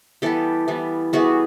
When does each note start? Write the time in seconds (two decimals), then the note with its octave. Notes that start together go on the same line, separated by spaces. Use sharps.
0.22 E3 G3 B3 G4 A4
0.68 E3 G3 B3
1.13 E3 G3 B3 F#4 G#4